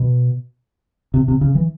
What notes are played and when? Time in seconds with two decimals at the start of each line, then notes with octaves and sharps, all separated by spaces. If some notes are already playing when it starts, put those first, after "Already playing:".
Already playing: B2
1.14 C3
1.28 C3
1.41 C#3
1.55 E3